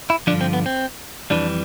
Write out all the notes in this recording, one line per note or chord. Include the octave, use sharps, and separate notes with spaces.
E4
G2 D3 F3 D4
C4
B3
C4
F2 E3 G3 D4